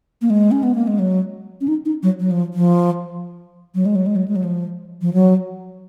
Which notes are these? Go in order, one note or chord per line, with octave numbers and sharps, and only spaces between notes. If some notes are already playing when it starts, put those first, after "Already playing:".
A#3
G#3
C#4
B3
A#3
G#3
F#3
C#4
D#4
D#4
F#3
F#3
F3
F3
F#3
G#3
F#3
G#3
F#3
G#3
F#3
F3
F3
F#3